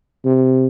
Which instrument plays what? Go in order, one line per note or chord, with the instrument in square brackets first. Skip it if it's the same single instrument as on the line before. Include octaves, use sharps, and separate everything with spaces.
[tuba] C3